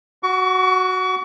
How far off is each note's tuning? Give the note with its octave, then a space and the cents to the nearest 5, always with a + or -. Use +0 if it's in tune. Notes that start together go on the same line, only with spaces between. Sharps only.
F#4 +0 C#6 +40